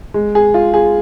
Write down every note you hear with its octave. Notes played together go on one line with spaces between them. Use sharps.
G#3
G#4
F4
G#4